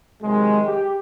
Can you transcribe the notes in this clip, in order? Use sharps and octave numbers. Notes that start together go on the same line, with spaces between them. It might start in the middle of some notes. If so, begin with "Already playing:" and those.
C3 D#3 F#3 G#3
G4